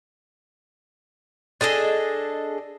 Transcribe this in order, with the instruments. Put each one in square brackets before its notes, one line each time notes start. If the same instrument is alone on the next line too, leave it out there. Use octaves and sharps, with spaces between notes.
[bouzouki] D4 G#4 A4 D#5